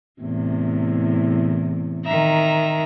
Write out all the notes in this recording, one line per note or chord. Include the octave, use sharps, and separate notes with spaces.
E2 A2 C3
D#3 E5 A#5